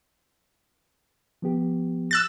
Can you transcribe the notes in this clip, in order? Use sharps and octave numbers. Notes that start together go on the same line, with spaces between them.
F3 B3 G4
E6 F#6 A6